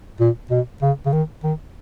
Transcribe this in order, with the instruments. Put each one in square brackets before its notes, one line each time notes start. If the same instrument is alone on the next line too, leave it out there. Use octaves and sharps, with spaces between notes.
[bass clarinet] A#2
B2
C#3
C#3
D#3
D#3